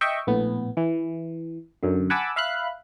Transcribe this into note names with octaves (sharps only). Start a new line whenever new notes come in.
D#5 E5 G5 C#6
A#1 A2 B3
E3
F#2 D3
F#5 G#5 A5 B5 D6 E6
E5 F5 B5 F#6